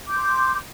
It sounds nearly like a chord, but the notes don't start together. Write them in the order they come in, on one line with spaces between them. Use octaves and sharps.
D6 G6 C6